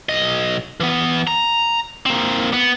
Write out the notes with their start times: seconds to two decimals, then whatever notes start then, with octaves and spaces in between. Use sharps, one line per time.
0.09 B1 D#5
0.80 E3 B3
1.27 A#5
2.06 A#3 C4
2.53 B3